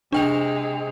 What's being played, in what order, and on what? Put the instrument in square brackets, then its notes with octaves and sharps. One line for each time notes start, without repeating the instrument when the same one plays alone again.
[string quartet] C3 G#3 [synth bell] D4 G5 F7